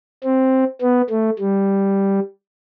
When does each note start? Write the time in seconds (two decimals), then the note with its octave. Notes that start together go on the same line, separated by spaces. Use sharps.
0.24 C4
0.82 B3
1.10 A3
1.39 G3